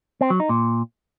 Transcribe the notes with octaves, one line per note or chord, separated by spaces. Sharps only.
C4
F#3
D#4
A#2